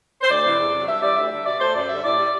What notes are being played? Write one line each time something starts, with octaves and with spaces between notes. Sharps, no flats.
C5
D2 D5
C3 E3
E2
C3 F#3
G2 E5
E3 G3 D5
D2 E5
D3 G3
B2 D5
A3 C5
F#2 D5
D3 G3 E5
A2 D5
G3